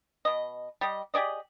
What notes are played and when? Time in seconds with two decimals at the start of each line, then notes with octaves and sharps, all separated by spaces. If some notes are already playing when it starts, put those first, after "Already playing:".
0.25 B2 D#5
0.81 G3 G4 D#5
1.14 G4 G#4 D5 D#5